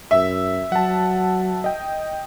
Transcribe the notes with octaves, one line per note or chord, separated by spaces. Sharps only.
F#2 E5
F#3 F#5 A5
D#5 G5